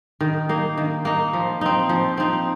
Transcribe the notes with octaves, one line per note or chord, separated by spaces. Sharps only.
D#3
A#3 D#4
D#3
A#3 D#4
F3
C4 D#4
F3
C4 D#4